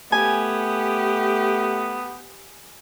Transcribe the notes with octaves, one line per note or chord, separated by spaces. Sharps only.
A3 B3 G4 G#5